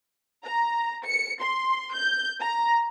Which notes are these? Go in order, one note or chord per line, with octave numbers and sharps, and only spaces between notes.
A#5
C#7
C6
G6
A#5